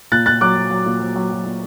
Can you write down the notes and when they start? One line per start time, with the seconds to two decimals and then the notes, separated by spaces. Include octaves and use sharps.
0.12 A#2 F#6 A6
0.26 A#2 F#6 A6
0.41 F#3 D6 F#6
0.56 F#3
0.71 F#3
0.86 A#2
1.01 F#3
1.16 F#3
1.31 F#3
1.46 A#2